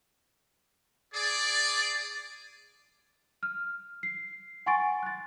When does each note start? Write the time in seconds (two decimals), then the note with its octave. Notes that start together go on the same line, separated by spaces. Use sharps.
1.14 G#4 D5
3.43 F6
4.03 C7
4.66 F#5 G#5 C6 C#6 A6 D7
5.03 F#6 A6